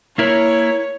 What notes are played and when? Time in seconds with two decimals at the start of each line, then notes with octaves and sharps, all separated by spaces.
0.18 A#3 E4 A#4 C#5